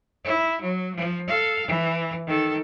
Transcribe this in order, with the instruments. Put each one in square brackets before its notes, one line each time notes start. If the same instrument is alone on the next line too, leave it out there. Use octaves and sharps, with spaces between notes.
[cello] E4
F#3
F3
A4 F5
E3
D#3 A4